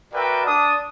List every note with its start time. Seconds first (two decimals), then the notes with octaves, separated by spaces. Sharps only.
0.13 F#4 A#4 B4 D5 E5 G5
0.45 D4 D#6